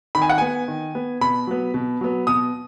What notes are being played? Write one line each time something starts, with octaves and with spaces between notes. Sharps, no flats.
D#3 B5
G#5
F#5
B3 G#5
D#3
B3
B2 B5
F#3 B3
B2
F#3 B3
B2 D#6